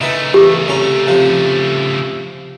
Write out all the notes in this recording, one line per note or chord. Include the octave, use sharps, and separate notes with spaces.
C#3 A3 D#4 E4 B4
E2 G4
C2 C#4 A#5
C3 F3